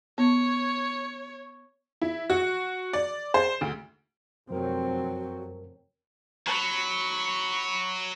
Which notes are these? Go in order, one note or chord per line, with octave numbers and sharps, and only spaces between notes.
B3 C#5
E4
F#4
D5
C5
D2
F1 F#2 F3 F#3 C4 F#4 A#4
F#3 B5 C#6